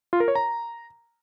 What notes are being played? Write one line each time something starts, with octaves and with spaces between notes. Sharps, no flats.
F4
A#4
C#5
A#5